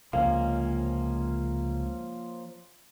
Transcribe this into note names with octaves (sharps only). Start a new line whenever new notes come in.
C#2 C3 F3 A#3 C#4 F5